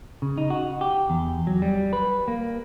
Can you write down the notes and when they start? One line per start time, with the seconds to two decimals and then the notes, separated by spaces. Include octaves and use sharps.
0.22 C#3
0.38 D#4
0.50 F#4
0.81 G4
1.10 E2
1.47 F#3
1.62 G3
1.93 B4
2.28 A#3